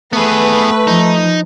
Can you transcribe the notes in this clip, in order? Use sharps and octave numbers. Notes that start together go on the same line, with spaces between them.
A3 B3 G#4 B4
F3 D#4